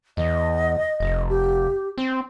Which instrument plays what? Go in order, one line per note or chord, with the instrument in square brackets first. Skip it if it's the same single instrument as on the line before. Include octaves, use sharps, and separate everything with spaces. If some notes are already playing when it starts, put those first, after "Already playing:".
[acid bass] E2 [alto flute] D#5
[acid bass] F1
[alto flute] G4
[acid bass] C4